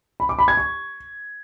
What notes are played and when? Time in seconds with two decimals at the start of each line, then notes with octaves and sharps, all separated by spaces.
0.20 B5
0.29 D6
0.39 B5
0.48 G#6
0.57 C#6